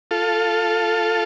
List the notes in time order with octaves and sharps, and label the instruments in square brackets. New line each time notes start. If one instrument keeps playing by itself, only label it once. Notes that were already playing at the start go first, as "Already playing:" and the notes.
[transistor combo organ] F4 A4